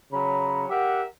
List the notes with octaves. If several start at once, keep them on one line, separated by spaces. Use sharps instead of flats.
C#3 F#3 C#4 A#5 B5
G4 A#4 E5 F#5